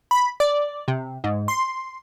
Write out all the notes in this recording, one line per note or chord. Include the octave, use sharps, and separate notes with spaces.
B5
D5
C3
G#2
C6